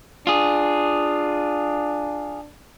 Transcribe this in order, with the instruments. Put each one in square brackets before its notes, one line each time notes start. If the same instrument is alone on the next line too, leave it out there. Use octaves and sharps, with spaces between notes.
[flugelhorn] D4 [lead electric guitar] F4 G#4